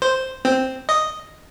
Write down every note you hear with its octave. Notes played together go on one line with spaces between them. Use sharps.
C5
C4
D#5